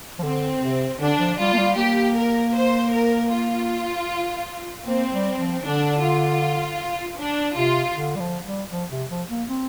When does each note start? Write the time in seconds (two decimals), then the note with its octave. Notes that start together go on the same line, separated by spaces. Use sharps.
0.19 F3
0.23 D3 C4
0.61 C3
1.00 D3 D4
1.19 F3
1.38 G3 F4
1.54 A#3
1.58 G3
1.77 A#3 G4
2.16 A#4
2.55 C5
2.93 A#4
3.31 F4
4.86 A#3 C4
5.12 G3
5.38 F3
5.63 D3 D4
6.02 F4
7.17 D4
7.56 C3 F4
7.95 D3
8.16 G3
8.20 F3
8.46 G3
8.71 F3
8.91 C3
9.10 F3
9.30 A#3
9.49 C4